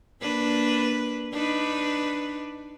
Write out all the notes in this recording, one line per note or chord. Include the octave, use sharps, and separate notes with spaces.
A#3 D4 B4
D4 D#4 B4